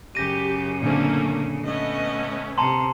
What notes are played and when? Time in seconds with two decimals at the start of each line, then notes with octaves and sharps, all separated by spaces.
0.15 F#2 C#3 G4 A#6 D#7
0.82 A#2 D3 A3 A#3 C4 C#4
1.65 A3 B3 C#4 D#5
2.58 C3 A5 A#5 C6